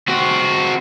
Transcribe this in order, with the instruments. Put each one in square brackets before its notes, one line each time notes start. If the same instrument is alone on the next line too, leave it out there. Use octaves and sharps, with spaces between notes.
[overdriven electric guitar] C4 F#4